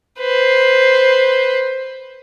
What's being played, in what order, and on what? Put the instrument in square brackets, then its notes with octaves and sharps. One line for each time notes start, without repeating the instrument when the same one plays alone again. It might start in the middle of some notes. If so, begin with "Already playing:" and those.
[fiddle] B4 C5